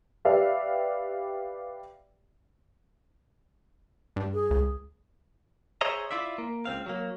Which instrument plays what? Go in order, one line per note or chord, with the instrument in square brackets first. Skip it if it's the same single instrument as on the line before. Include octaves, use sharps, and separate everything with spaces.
[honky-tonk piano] G4 B4 D5 E5 F5
[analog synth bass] G2
[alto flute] G#4
[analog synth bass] C#2
[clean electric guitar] G#4 C5 C#5 D#5 E5 A#5
E4 F4 D5 E5
A#3
C#2 C4 F5
F#3 A#3